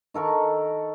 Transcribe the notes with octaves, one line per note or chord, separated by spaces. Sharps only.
D#3 A4 A#4 C#6